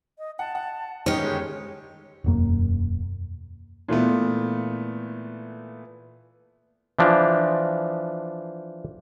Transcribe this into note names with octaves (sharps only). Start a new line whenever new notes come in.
D#5
F#5 A5
F#5
G1 D#3 C#4 D#4 G4 C#5
G#3
E1 F#2 A#3
A#2 E3 A3 B3
E3 F3 D4